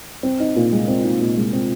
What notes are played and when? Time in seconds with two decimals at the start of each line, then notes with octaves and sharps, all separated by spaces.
0.23 C4
0.40 D#4
0.56 A#2
0.72 G#3
0.88 C4
1.04 D#4
1.20 A#2
1.37 G#3
1.53 C4